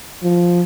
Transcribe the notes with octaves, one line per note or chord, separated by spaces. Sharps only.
F3